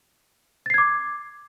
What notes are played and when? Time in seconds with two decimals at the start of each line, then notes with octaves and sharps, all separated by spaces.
0.66 A6
0.70 C7
0.74 G#6
0.78 D6